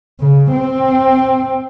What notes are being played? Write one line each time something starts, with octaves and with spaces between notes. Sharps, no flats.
C#3
C4